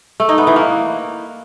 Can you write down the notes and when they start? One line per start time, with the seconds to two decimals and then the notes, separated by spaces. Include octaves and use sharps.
0.20 A3
0.29 D#4
0.38 B3
0.47 E3
0.56 A#3